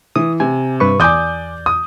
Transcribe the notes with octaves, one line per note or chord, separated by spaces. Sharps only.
E3 D#6
C3 G#5
G2 B4 C#6
E2 D5 G#5 D6 D#6 G6
D#6